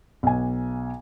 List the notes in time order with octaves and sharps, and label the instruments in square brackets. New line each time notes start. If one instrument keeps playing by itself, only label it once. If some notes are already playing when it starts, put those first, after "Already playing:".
[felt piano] B1 G#5